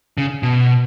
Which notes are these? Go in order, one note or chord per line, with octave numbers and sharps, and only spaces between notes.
C#3
B2